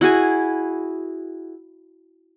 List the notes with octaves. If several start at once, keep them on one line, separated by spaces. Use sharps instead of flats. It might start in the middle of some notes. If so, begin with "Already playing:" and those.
E4 F#4 G#4 G#5